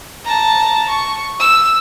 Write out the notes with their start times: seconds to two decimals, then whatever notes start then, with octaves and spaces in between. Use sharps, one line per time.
0.25 A5 A#5
0.88 C#6
1.40 E6